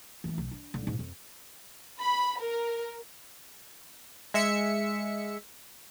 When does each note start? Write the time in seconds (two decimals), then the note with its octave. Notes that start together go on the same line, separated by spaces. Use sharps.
0.24 E3 A3
0.38 B1
0.51 D4
0.74 D1 D3
0.87 G#2
0.99 F2
2.00 B5
2.40 A#4
4.34 G#3 E5 C#7